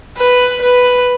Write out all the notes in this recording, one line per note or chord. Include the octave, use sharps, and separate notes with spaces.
B4
B4